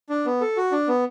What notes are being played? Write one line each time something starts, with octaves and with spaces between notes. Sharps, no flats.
D4
B3
A4
F#4
D4
B3